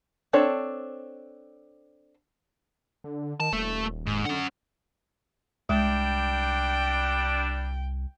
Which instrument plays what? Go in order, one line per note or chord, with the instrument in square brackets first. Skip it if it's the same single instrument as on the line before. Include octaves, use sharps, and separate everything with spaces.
[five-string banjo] C4 D4 A4 C#5
[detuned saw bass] D3
[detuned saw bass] D#3 [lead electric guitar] A5
[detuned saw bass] D#1 [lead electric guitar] A3 A4
[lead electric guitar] G#2
[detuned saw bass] D3 [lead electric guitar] C#4 F#5
[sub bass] C2 [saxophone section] G3 D4 [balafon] G#3 [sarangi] G5